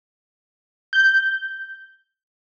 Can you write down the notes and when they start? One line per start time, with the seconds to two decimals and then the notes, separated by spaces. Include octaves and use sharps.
0.93 G6